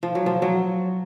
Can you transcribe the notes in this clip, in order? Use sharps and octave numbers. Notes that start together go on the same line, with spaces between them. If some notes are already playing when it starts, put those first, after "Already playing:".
F3
F#3
F3
F#3